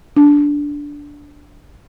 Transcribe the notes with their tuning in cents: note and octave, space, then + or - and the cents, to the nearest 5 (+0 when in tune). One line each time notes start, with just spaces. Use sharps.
D4 -10